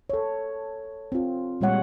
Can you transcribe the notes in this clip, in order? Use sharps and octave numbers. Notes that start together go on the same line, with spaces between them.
A4 C#5
C4 F4
A#2 G3 G#3 C#5 F#5